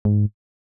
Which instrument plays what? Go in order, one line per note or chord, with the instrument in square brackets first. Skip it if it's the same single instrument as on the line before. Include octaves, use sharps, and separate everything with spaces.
[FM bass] G#2